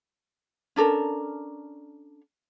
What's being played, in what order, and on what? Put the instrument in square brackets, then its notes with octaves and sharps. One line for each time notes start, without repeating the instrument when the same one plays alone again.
[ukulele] C#4 D4 A4 A#4